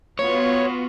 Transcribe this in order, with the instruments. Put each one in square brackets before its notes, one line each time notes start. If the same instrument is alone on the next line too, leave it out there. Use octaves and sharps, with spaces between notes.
[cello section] B3 F4 F#4 [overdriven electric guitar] C#5